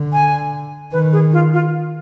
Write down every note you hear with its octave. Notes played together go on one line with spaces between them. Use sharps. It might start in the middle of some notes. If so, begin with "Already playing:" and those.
Already playing: D3
G#5
D#3 B4
G#4
F4
F4